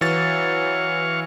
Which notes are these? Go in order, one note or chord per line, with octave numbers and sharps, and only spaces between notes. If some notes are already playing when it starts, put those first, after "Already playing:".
E3 F#3 F5 C#6 A6